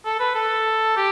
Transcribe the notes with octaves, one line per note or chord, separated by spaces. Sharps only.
A4
B4
A4
G4